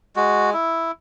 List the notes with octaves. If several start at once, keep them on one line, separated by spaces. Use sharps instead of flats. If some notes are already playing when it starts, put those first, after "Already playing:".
G#3 F#4
E4